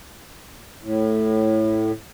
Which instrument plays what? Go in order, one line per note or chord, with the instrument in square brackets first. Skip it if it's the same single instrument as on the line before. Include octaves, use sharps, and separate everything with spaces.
[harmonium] A2